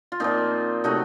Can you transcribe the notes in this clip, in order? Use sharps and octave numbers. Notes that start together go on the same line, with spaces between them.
F4
A#2 F3 A#3 C4 D#4
C3 F#3 A3 D#4 F#4